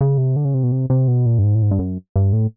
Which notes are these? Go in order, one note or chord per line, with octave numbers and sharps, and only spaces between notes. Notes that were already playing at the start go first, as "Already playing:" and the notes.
C#3
C3
D3
C#3
C3
B2
C3
C3
B2
A#2
G2
G#2
A2
G#2
G2
F#2
G2
A2